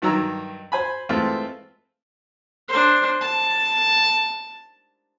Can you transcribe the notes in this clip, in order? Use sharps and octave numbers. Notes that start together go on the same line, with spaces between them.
G2 D#3 F#3 A#5 E6
C5 G#5 B5
E3 G#3 A3 C4 F4
D4 C5
A5